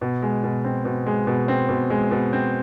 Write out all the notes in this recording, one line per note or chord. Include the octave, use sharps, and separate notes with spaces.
B2
G#3
B2
C4
B2
G#3
B2
C4
B2
G#3
B2
C4